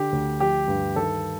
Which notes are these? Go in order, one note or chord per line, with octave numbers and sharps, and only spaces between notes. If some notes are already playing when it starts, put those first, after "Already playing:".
Already playing: D3 G4
D2
F3 G4
G2
D#3 A4